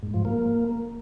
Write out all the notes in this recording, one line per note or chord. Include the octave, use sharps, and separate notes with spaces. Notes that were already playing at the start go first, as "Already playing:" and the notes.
G#2
F3
A#3